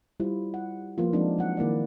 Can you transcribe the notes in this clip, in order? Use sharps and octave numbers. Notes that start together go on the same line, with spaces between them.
G3 E4 F4 C5
F#5
F3 A#3 B3 F4
F3 G#3 C4 D4 D#4
F#3 F#5
D#3 A#3 E4 D5